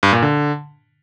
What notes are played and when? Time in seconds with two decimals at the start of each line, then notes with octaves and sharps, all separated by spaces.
0.03 G2
0.13 A#2
0.22 D3